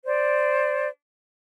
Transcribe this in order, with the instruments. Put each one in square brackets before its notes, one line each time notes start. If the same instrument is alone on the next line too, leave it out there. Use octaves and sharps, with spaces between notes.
[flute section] C5 D5